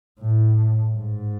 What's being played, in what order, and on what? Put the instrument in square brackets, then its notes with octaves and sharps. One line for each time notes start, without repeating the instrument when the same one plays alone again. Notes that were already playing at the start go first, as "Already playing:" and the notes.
[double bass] A2
G#2